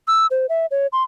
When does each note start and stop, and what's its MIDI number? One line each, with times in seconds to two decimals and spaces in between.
0.08 0.26 88
0.31 0.46 72
0.49 0.66 76
0.71 0.87 73
0.93 1.03 84